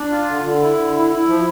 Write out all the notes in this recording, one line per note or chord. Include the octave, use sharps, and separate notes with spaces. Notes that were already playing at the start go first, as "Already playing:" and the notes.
Already playing: D4
F4
D3
D3
E4
D3
E4
E4
F3